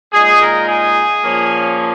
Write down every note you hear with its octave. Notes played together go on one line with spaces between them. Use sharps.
A#2 G#3 D#4 G#4
A#4
G#4
A#2 F3 A#3 C#4